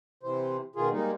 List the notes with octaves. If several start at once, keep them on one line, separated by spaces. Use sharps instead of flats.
C3 E3 C5
B2 D#3 F4 G#4
G3 G#3 A#3 D#4